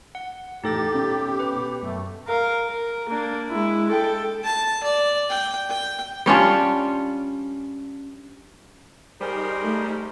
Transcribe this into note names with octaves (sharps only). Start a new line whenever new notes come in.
F#5
E2 A2 D#4 G4 A4 A6
B2 C#4
B4
B2
F#2 A3
A#4 F5
A#4
A#3 D4
G#3 E4
A4 G5
A5
D5
G5
G5
G3 C#4 D4 F4
G3 D#4 G#4 A#4 C5
A3